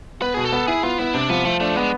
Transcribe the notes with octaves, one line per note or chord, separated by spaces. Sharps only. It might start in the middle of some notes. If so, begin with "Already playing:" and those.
B3 B4
B2 G#4
A4
B3
E4 G#4
B3 F4
B3 E4
C3 D4
F3 B3
F3 A3
A3 D4
G#3 B3